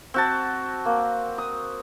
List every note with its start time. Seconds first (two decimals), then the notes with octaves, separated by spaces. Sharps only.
0.14 C4 F#4 A5
0.85 A#3
1.38 D#6